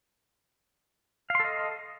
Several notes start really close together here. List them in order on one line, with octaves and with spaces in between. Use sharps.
F5 C6 A4 D#5